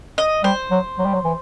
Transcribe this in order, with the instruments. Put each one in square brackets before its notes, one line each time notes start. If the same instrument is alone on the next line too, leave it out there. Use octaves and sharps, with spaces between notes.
[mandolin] D#5
[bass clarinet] G3 [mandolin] C5
[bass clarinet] F#3
F#3
G3
F#3
E3